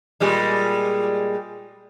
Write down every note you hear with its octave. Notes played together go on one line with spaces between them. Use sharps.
A#2 G3 G#3